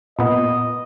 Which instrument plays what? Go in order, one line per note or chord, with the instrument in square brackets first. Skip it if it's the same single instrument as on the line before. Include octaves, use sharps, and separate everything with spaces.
[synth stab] A#2 B3 [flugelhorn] D#5